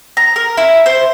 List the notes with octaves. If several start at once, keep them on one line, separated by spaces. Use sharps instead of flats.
A#5
A#4
E4
C5